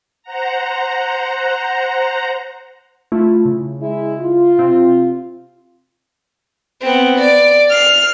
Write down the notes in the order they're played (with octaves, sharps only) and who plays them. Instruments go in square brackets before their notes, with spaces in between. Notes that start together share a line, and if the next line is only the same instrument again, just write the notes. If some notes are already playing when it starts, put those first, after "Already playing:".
[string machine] C5 F#5 A#5
[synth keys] A3 E4 F4
C#3
[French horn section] G#3 E4
F4
[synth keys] C3 C4
[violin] B3 C4
D5
F6 C7